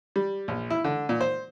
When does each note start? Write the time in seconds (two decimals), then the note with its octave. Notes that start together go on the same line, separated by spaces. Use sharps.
0.16 G3
0.48 A#1
0.70 E4
0.84 D3
1.09 A#2
1.21 C5